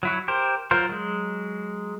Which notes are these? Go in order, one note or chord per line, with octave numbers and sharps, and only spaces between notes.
F#3 E4 F#4
G4 A#4 C5
F#3 F4 A#4 C5
F#3 G#3